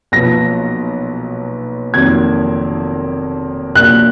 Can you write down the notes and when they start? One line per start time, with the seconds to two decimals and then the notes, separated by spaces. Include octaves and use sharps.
0.12 B1 A#2 F3 B3 A#6
1.94 F1 F2 D#3 F#3 A#3 G#6
3.75 A#1 A#2 F#3 F#6